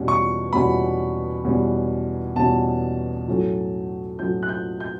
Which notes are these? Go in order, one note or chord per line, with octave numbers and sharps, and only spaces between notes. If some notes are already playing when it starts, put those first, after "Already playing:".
Already playing: E2 B2 G3 C#4
C#6
E2 B2 G3 C#4 B5
E2 B2 G3 C#4
E2 B2 G3 C#4 A5
A2 F#3 A3 C#4
A2 F#3 A3 C#4 G6
F#6
G6
G6